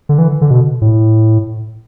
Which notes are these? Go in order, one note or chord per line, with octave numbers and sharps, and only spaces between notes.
D3
E3
D3
B2
A2